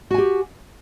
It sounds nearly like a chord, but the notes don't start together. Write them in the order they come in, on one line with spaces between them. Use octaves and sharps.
F#4 G#5 G4